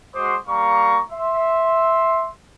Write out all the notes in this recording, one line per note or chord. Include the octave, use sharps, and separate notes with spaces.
G#3 F#4 C5 C6 D6 D#6
G3 A#3 F5 A#5 C#6
E5 C6